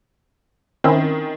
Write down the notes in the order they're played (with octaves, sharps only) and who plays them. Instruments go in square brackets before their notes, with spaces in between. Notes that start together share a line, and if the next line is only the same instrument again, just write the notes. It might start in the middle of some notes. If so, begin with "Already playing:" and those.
[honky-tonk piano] D#3 [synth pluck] C4 C#4 E4